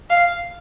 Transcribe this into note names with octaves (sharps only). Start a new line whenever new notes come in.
F5